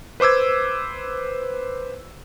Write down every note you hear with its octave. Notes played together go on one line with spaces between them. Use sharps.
B4 C5 D6 E6 G#6